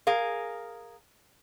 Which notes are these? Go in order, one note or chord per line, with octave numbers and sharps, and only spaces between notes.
G#4 A#4 F5